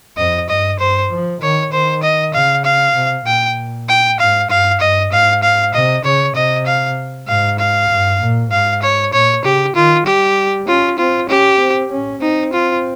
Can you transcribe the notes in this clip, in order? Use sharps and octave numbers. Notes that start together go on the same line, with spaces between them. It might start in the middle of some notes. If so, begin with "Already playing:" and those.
F2 D#5
G2 D#5
G2 C5
F3
D#3 C#5
D#3 C5
D#5
C#3 F5
F5
C3
A#2 G5
G5
G#2 F5
G2 F5
G2 D#5
G#2 F5
F5
C3 D#5
C#3 C#5
C3 D#5
F5
G#2 F5
F5
G2
A#2
G#2 F5
C#5
A#2 C#5
C#3 G4
D#3 F4
G3 G4
C#4 F4
C4 F4
C#4 G4
C4
C#4
C4 D#4
F4